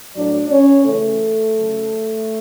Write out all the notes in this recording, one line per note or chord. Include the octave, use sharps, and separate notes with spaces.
A2 F#3 D4 D5
C#4 C#5
C#3 E3 A3 A4
C#3 F#3